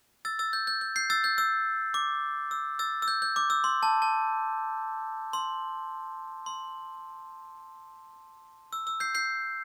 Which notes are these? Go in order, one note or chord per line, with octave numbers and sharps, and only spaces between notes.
E6 A6
E6 A6
G6
G6
G6
G6 C7
E6 A6
G6
E6
D6
E6
E6 A6
E6
G6
G6
D6
E6
C6
A5
A5
C6
C6
E6
E6
G6 C7
G6 C7